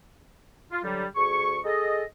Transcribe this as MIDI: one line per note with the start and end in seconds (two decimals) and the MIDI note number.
0.71 0.79 65
0.83 1.05 50
0.83 1.05 54
0.83 1.05 55
1.15 1.58 38
1.15 1.58 68
1.15 1.58 85
1.65 2.03 68
1.65 2.03 69
1.65 2.03 75